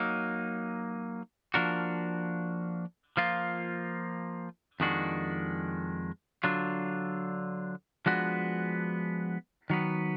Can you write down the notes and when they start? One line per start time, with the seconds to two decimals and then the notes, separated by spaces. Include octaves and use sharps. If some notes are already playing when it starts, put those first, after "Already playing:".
Already playing: F#3 A#3 D#4
1.54 F3 A#3 D4 F#4 A#4
3.17 F3 A#3 F4
4.80 F2 D#3 G#3 D4 F#4
6.44 D3 F#3 D4 F4
8.06 F3 G#3 B3 D4 F#4
9.70 D#3 F#3 B3